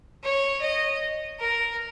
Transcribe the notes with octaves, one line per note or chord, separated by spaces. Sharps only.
C#5
D#5
A#4